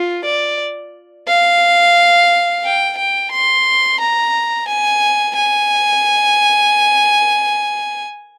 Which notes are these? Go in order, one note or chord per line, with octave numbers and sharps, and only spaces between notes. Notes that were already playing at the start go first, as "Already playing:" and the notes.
Already playing: F4
D5
F5
G5
G5
C6
A#5
G#5
G#5